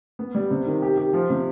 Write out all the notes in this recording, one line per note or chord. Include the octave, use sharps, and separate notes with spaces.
B3
G3
C3
D#3
G4
G4
F3
C3